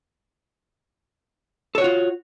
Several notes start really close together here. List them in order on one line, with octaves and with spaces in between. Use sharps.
A4 C#5 F#4 F4